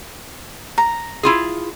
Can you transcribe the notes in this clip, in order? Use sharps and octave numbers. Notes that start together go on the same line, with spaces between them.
A#5
E4 F4 G#4